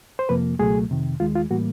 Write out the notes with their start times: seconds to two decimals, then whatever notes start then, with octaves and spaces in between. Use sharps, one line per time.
0.19 C5
0.29 F2 C3 F3 A#3 B4
0.59 C#2 B2 F#3 A3 G#4
0.90 F2 C3 D#3
1.20 D#2 D#3 G#3 F4
1.36 F4
1.51 A2 E3 G3 A#3 F#4